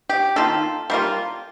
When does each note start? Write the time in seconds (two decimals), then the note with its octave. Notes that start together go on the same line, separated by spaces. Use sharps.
0.09 G4
0.36 D#3 A#3 F4 A4
0.90 G3 A#3 F4